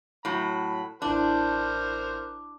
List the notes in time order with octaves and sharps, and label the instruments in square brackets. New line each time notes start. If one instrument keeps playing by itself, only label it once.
[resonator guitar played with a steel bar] A2 F#3 [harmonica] B5
[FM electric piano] A1 E4 F#6 [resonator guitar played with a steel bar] D4 [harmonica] A#4 C5